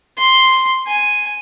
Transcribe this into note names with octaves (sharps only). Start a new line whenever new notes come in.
C6
G#5